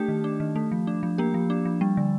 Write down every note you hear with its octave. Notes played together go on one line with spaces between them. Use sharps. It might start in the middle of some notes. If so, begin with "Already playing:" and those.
Already playing: A3 D4 G4
D#3
D4
D#3
A3
F3
D4
F3
A#3 G4
F3
D4
F3
G3
D3